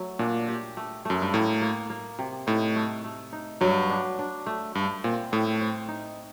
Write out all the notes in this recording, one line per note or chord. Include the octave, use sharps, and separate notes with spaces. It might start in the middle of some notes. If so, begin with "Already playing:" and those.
Already playing: F#3 A3
A#2 D4
G4
A3
F#2 A3
G2
A2 A#3
A#3
A#3
C3
A2 D#4
A3
A3
D#4
G2 F#3
D4
D4
A3
G2 A3
A#2 C4
A2 A3
C4
D#4